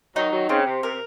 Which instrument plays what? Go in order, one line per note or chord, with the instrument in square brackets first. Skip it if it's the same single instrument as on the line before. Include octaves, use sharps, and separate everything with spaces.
[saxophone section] D#3 F#3 [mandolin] D#4
[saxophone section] D#3 F#3
[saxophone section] C#3 [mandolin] C4
[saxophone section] C3
[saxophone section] C3 [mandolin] A#4